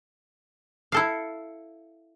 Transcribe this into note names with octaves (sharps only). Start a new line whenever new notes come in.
E4 A4 F5